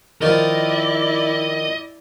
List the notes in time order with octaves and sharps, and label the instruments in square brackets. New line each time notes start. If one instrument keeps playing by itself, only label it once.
[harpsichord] D#3 F3 [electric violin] E4 D5 [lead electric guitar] D#5